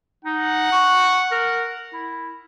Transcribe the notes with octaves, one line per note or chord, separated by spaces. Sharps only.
D#4 F#5
C#6
A#4
E4